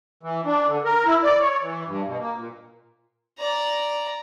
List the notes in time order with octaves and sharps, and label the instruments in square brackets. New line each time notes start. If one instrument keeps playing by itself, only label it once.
[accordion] E3
D4
D3
A#4
E4
D5
C#5
E3
G2
B2
A#3
A#2
[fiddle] D5 A#5